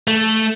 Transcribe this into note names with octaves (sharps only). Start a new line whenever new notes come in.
A3